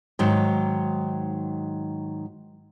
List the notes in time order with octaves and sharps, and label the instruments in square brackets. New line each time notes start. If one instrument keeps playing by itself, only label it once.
[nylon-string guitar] G#2 D#3 F#3